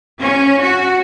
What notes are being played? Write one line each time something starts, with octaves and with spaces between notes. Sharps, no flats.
C#4
F#4